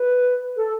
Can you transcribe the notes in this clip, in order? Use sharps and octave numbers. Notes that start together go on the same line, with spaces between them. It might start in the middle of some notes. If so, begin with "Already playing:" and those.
Already playing: B4
A4